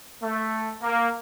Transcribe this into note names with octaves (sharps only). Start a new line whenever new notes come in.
A3
A#3